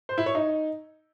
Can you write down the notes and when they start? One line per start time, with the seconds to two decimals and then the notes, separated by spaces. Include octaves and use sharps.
0.09 C5
0.18 E4
0.26 C#5
0.35 D#4